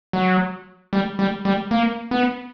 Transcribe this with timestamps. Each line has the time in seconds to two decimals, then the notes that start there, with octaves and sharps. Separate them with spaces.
0.13 F#3
0.93 G3
1.19 G3
1.45 G3
1.71 A#3
2.11 B3